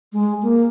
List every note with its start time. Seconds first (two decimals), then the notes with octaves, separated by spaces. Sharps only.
0.12 G#3
0.42 A#3